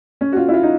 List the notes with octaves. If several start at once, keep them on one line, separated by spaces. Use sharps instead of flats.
C#4
F#4
F4
E4
F4
D#4